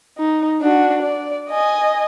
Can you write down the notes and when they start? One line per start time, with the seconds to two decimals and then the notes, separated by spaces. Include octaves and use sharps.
0.18 D#4
0.62 D4 F#4
1.02 D5
1.50 D#5 G#5